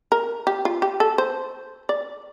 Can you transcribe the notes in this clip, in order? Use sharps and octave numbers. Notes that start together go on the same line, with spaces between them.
A#4
G4
F4
G4
A4
C5
D5